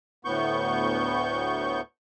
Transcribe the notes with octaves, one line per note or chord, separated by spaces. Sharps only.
D2 A2 B3 C#6 G6